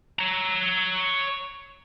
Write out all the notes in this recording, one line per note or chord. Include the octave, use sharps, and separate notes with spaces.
C#5 A#5